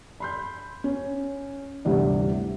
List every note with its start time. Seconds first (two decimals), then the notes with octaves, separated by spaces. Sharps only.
0.20 B5 C6 G6
0.84 C#4
1.85 G1 D2 C3 E3 D5